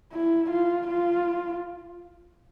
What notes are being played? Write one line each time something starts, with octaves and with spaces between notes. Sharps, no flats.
E4
F4
F4